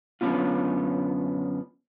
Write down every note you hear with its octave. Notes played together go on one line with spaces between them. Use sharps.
F#2 D3 F3 B3 C#4 F4